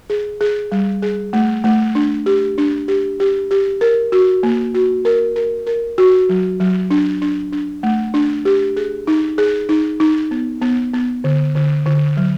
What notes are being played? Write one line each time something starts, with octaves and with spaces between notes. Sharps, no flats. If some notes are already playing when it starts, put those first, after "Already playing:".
G#4
G#4
G3
G#4
A3
A3
D4
G4
D4
G4
G4
G4
A#4
F#4
A#3
F#4
A#4
A#4
A#4
F#4
F#3
F#3
D4
D4
D4
A3
D4
G4
G#4
D#4
G#4
D#4
D#4
B3
B3
B3
D3
D3
D3
F#3